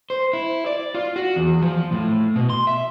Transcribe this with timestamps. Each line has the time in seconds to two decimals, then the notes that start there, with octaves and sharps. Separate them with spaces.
0.10 C5
0.33 E4
0.66 D5
0.95 F4
1.16 F#4
1.36 E2
1.62 F3
1.92 A2
2.36 B2
2.50 C6
2.67 E5